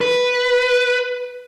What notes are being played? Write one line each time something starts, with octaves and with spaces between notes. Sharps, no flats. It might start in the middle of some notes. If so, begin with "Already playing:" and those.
B4